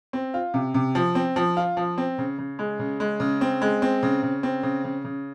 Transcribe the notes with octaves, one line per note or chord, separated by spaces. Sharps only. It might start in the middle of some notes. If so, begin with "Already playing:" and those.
C4
F4
C3
C3
F3
C4
F3
F4
F3
C4
C#3
C#3
G#3
C#3
G#3
C#3
C4
G#3
C4
C#3
C#3
C4
C#3
C#3
C#3